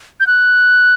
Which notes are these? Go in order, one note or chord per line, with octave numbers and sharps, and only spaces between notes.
G6
F#6